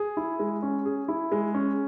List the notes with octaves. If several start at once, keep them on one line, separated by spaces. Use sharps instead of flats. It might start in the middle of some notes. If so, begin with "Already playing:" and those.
Already playing: G#4
E4
G#3
C#4
G#4
E4
G#3
C#4